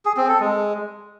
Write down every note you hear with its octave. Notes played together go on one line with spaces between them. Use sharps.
G#4
C4
A4
G#3